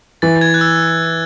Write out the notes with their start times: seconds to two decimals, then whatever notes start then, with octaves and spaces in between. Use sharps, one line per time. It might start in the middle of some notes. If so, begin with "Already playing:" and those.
0.22 E3 A6
0.41 G#6
0.54 F#6
0.61 E6